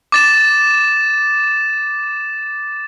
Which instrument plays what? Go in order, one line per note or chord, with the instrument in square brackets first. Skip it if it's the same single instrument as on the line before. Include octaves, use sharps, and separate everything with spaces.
[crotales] D6 A6 E7